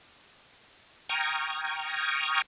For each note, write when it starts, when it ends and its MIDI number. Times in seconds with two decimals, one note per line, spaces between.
1.09 2.42 79
1.09 2.42 82
1.09 2.42 85
1.09 2.42 87
1.09 2.42 89
1.09 2.42 92